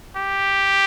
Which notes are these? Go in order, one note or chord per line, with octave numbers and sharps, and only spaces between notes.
G4